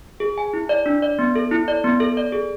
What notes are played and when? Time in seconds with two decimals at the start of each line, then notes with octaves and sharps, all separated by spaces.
0.20 G#4
0.38 G#5
0.53 E4
0.69 D5
0.86 D4
1.02 D5
1.19 B3
1.35 A4
1.51 E4
1.68 D5
1.84 B3
2.00 A4
2.17 D5
2.32 G#4